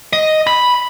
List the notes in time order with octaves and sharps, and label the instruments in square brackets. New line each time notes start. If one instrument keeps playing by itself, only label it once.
[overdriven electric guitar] D#5
B5